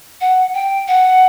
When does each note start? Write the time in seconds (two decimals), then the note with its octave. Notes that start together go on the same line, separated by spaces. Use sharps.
0.21 F#5
0.54 G5
0.88 F#5